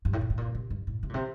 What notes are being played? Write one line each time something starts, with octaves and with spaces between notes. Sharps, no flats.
G2
A2
A#2
A2
A#2
C3
G2
A2
C3
A#2
C3